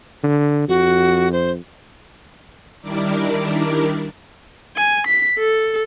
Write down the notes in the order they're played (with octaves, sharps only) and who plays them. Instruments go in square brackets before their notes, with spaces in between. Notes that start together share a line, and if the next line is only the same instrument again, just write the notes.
[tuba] D3
[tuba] F2 [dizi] F#4
[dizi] C5
[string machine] D#3 G3 D4 E4 A#4 D5
[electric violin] G#5
B6
A4